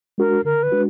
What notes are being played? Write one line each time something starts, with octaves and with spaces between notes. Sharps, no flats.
G#3 D4 F#4 A#4
D3 A#4
B4
G#3 D4 F#4